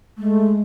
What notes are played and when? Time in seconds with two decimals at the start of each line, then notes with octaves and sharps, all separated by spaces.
0.18 G#3 A3